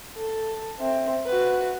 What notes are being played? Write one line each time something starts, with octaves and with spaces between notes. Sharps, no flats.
A4
C4 E5
F#4 B4